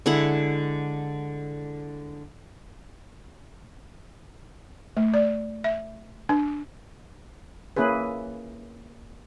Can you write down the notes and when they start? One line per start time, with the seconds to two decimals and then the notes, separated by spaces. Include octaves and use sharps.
0.06 D3 G#3 E4 F#5
4.97 A3
5.14 D5
5.64 E5
6.29 D4
7.76 A#3 C#4 E4 G#4 B4